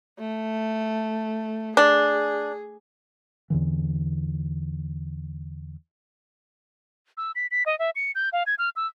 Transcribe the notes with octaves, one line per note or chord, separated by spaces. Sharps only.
A3
D4 G#4
E2 D3 E3
E6
B6
B6
D#5
E5
C#7
G6
F5
G#6
F6
E6